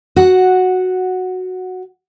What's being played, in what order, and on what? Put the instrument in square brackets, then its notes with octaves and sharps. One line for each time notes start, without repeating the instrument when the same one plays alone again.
[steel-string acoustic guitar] F#4 F#5